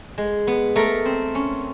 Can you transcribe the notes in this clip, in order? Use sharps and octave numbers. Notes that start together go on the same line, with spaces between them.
G#3
B3
A3 A#4
C4
C#4